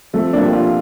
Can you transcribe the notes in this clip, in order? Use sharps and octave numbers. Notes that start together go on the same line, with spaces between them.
F3 A3 C4
A#3 D4
F3 G4
D4 F4